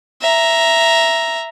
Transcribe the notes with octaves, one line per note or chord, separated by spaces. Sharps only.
E5 A#5